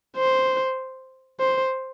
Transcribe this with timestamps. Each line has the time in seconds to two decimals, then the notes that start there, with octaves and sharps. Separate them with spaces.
0.17 C5
1.40 C5